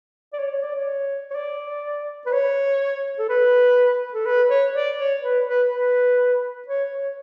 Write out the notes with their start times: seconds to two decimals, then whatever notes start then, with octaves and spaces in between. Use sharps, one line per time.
0.33 D5
0.39 C#5
0.51 C#5
0.63 D5
0.75 C#5
1.30 C#5
1.35 D5
2.26 B4
2.32 C#5
3.18 A4
3.29 B4
4.14 A4
4.26 B4
4.50 C#5
4.74 D5
4.98 C#5
5.22 B4
5.46 B4
5.71 B4
6.68 C#5
6.92 C#5